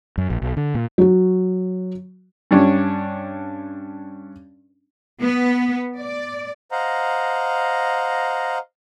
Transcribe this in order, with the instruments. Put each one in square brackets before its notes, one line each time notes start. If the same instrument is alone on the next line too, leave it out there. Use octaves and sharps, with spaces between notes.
[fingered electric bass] F#2
A#1
B1
D3
A#2
[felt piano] F#3 F#4
[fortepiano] G2 C#4 D4 C#5
[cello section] B3
D5
[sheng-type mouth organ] C5 D#5 F5 F#5 A#5